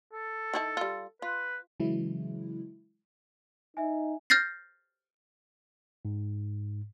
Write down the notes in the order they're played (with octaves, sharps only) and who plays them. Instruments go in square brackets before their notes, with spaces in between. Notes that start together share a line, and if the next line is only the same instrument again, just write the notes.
[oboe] A4
[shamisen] D#3 E4 A5
G3 F4
[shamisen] F4 [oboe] B4
[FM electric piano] C#3 E3 F#3 G#3 E4
[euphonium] D#4 [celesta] E5 G#5
[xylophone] F6 G6 A6 A#6 C7
[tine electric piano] G#2